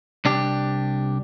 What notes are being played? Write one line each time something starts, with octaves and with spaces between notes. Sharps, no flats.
C2 D4 G4